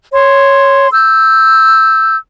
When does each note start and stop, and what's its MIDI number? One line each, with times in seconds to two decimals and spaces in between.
0.12 0.87 73
0.12 0.87 84
0.92 2.16 88
0.92 2.16 91